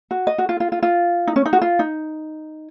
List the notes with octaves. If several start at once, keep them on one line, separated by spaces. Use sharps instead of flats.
F#4
D#5
F#4
F4
F4
F4
F4
D#4
C#4
D#4
F#4
F4
D#4